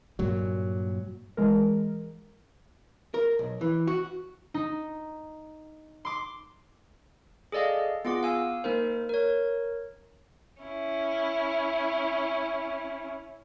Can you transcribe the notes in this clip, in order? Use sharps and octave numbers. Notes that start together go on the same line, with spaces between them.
G2 A#2 F#3
E3 G#3 A#4
A#4
B1
E3
F#4
D#4
C6 D6
G#4 A4 D5 D#5 F5
B3 F4 G#4 F#5 D6
F5 G#5 E6
A#3 D#4 A#4 C5
A#4 C#5
C#4 E4